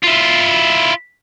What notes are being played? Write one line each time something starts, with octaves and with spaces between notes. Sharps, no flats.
E4 F4